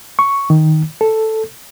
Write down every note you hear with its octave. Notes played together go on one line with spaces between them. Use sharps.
C#6
D#3
A4